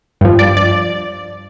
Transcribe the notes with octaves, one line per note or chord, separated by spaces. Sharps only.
G2 F3
D5
D5